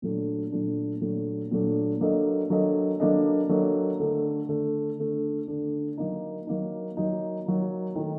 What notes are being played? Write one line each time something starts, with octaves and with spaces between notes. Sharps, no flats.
A#2 F#3 A3 D4
A#2 F#3 A3 D4
A#2 F#3 A3 D4
A#2 F#3 A3 D4
F#3 A#3 D4 A4 D#5
F#3 A#3 D4 A4 D#5
F#3 A#3 D4 A4 D#5
F#3 A#3 D4 A4 D#5
D3 A3 D4
D3 A3 D4
D3 A3 D4
D3 A3 D4
F#3 A#3 D#4
F#3 A#3 D#4
F#3 A#3 D#4
F#3 A#3 D#4
D#3 A3 D#4